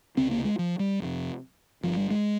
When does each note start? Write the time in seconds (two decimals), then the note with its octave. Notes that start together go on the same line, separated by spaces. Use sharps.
0.17 C#2 C3 C4
0.31 A#3
0.45 G#3
0.59 F3
0.79 G3
1.00 F1 F2 C3
1.83 G1 G2 F3
1.97 G3
2.10 G#3